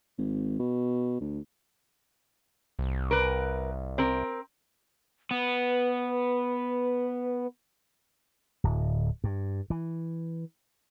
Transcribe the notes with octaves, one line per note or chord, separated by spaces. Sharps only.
G#1
B2
D2
C2
A#4 B4
C4 A#4
B3 B4
D1
G2
E3